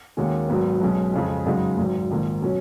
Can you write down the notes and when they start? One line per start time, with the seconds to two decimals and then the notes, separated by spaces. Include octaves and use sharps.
0.17 D#2 D#3 G#3 C#4 F#4
0.49 G#1 G#2 F#3 B3
0.81 B1 B2 G#3 C#4
1.13 F2 C#3 G#3
1.46 F#2 C#3 G#3 D#4 F#4
1.78 G#1 G#2 F#3
2.10 A#1 G#2 D#3
2.42 B2 F#3 C#4